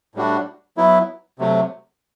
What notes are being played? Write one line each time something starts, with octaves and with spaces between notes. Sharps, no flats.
A2 G3 D4 F#4
F#3 B3 E4
C3 F#3 A3